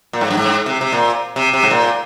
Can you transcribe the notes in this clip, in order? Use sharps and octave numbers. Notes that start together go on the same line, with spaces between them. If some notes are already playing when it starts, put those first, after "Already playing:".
A#2
G#2
G2
G#2
C3
C3
A#2
C3
C3
G#2
A#2